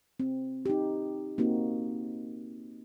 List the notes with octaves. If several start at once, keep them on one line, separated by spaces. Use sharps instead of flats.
C4
D#4 G4
A#3 C4 D#4 F#4